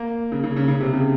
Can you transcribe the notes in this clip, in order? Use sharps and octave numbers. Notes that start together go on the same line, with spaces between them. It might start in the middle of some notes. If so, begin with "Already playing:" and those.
Already playing: A#3
C#3
C#3
C#3
C#3
C3
C#3